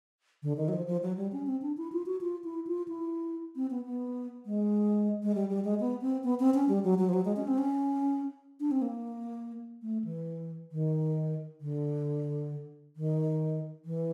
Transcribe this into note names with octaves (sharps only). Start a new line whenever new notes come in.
D3
D#3
F#3
F3
F3
F#3
G3
C#4
C4
D4
E4
F4
F#4
F4
E4
F4
E4
C4
B3
B3
G#3
G#3
G3
G3
G#3
B3
C4
B3
C4
C#4
G3
F#3
F#3
F3
F#3
G#3
C#4
C4
C#4
D4
C4
A#3
A3
E3
D#3
D3
D#3
E3